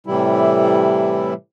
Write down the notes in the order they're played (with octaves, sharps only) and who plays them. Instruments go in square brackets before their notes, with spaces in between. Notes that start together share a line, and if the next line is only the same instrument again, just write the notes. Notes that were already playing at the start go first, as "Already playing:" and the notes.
[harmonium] A2 C3 E3 G3 E4